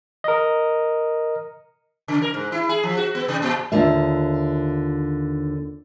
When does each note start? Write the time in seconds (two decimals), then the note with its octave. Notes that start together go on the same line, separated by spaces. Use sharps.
0.24 A#4 D#5
2.08 C#3
2.22 A#4
2.34 G#2
2.52 E4
2.69 G#4
2.83 F3
2.97 F#4
3.15 B3
3.28 C3
3.42 A#2
3.72 D#2 D3 F4 E5